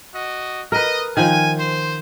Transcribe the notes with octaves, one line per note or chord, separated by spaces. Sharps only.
F#4 D#5
A#4 B4 D#5
D#3 F3 G#5
C5